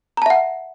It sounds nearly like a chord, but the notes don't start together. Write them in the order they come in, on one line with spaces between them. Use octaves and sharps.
A#5 A5 E5 F#5